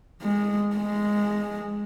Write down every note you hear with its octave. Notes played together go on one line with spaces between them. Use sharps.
G#3
G#3